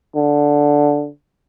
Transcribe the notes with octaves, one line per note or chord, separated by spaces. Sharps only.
D3